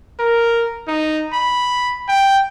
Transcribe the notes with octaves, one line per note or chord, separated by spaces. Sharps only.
A#4
D#4
B5
G5